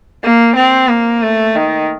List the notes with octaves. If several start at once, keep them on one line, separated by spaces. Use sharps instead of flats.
A#3
C4
A#3
A3
D#3